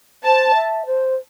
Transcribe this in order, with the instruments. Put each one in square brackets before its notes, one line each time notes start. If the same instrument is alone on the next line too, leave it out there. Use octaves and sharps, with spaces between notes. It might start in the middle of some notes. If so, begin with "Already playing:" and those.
[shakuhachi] C5 [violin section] A5
[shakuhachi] E5
C5